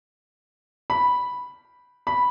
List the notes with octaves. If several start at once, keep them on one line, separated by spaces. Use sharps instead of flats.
B5
B5